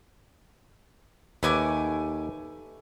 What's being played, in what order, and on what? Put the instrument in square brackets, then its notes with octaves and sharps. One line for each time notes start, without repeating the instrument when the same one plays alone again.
[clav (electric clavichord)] D#2 B4 [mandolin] A3 G#5 D6